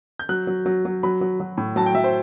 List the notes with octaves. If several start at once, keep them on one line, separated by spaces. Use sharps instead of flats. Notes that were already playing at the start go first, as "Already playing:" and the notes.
G6
F#3 F#6
F#3
F#3
F#3
F#3 B5
F#3
F#3
A2
F#3 A5
G5
F#3 E5
C5